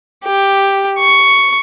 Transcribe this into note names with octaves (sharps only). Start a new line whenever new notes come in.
G4
C#6